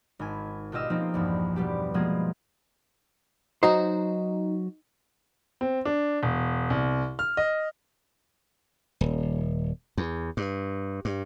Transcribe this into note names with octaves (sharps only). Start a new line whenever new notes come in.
G#1 G#5
B2 F4 G4 D#5 E6
F3 A#3 C4 D#4
A#1 E2 G2
B2 G3 G4
B2 F3 G#3 A#3 C4 G#4
F#3 D#4 F#4 C5
C4
D4
E1
C2
F6
D#5
D#1
E2
G2
G2